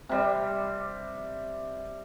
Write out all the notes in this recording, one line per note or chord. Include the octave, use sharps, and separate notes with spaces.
C3 G3